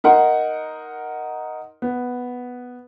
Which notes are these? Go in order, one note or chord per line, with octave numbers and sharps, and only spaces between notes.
D#4 A#4 F#5 C6
B3